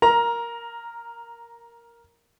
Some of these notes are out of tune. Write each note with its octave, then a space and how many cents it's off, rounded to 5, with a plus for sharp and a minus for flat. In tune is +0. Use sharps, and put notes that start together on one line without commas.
A#4 +0 A#5 +15